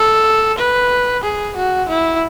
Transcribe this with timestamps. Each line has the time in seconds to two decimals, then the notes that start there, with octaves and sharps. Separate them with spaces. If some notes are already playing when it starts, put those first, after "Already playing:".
Already playing: A4
0.58 B4
1.23 G#4
1.56 F#4
1.89 E4